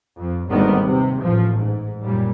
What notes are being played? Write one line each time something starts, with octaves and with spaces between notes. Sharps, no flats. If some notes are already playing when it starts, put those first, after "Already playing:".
F2
G#1 D#2 D3 D#3 G3 B3
C3
A1 F3
G#2
F#2 A#2 G3